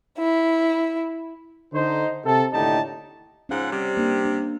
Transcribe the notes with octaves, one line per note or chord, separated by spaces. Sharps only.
E4
D3 D#4 C5
C3 A4
D#2 A2 D3 D#4 G4 A5
G#2 F3 C#4 F#5
C3 G3
A#3 D4
D4